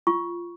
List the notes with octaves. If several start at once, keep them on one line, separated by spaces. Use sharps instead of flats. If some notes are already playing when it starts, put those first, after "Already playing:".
F4 C#6